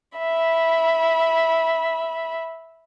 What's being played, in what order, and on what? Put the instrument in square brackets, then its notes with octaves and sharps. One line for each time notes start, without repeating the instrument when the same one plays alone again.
[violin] E5 B5